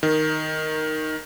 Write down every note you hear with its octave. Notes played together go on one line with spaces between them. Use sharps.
D#3